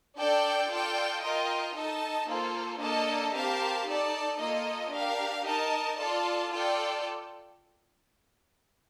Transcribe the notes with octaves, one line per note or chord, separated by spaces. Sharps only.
D4 A4 D5 G5
F4 A4 D5 G5
F4 A#4 D#5 G5
D#4 A4 D#5 A5
A#3 F4 A4 C5
A#3 D4 A4 D#5 A5
C4 G4 A#4 F5 A5
D#4 A4 D5 A5
A#3 F4 A4 D#5
D4 G4 A#4 F5
D#4 A#4 D#5 A5
F4 A4 D5 A5
F4 A4 D5 G5